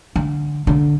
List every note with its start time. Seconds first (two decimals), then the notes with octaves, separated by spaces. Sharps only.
0.16 D3
0.67 D3